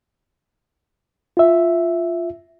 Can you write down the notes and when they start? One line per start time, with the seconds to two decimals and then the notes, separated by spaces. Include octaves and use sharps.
1.37 F4 E5